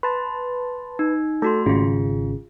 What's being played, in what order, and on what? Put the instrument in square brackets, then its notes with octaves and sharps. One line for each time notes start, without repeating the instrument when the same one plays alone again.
[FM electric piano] B4 A5 [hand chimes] C6
[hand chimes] D#4
[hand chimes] A3 F#4 C6 [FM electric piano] A4
[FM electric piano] G#1 C#3 [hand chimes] F4 G#4